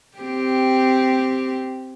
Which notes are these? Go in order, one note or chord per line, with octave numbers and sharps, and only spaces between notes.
C4 G4